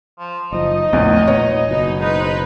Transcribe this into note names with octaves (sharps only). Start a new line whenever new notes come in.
F3
F#1 F3 D#4 D#5
A#1 E2 A2 E3
A#2 B3 C#5
F#1 B2 D#4 B4
G#3 D#4 B4 C5